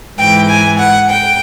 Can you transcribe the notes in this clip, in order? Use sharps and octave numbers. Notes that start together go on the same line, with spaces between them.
G#2 E3 G5
G#5
F#5
G5